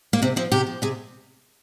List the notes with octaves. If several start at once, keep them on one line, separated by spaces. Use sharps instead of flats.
A#3
C3 C4
F3 C4
C3 G4
F3
C3 G#4